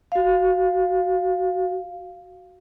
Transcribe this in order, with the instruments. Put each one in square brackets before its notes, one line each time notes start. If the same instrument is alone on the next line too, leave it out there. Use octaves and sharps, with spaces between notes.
[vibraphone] F#4 F5